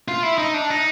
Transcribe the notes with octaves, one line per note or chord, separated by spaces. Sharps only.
F4
E4
D#4
D4
D#4